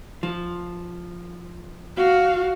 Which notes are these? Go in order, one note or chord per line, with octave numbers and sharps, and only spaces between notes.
F3
F#4 F5